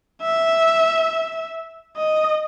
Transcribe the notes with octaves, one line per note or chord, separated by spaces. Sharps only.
E5
D#5